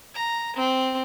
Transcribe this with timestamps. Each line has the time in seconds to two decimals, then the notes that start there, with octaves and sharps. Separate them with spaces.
0.15 A#5
0.57 C4